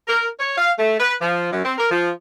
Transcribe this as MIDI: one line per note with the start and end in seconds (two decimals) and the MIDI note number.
0.08 0.27 70
0.40 0.53 73
0.58 0.72 77
0.79 0.98 57
1.00 1.14 71
1.21 1.48 53
1.52 1.62 42
1.65 1.73 60
1.78 1.87 70
1.91 2.10 53